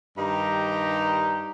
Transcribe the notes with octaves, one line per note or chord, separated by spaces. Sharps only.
G2 D#3 D#4 G4 A#5